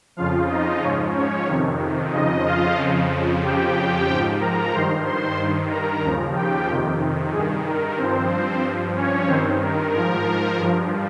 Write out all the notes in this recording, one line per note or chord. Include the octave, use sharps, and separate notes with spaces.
F2 C#3 F3 F4 F5
D#4 D#5
G#2 F3 C#4 C#5
C#4 C#5
F2 C3 D#3
F2 C#3 F3 D#4 D#5
F4 F5
F2 C#3 F3
F2 C#3 F3 G4 G5
G#2 F3 G4 G5
A#4 A#5
G2 D#3 C5 C6
C5 C6
G2 D#3
A#4 A#5
D#2 C#3 F3
G4 G5
F2 C3 D#3
G2 D#3 G#4
A#4
G2 F3 C4 C5
G2 F3
C#4 C#5
G2 D#3 C4 C5
A#4
G#2 F3 A#4
G2 F3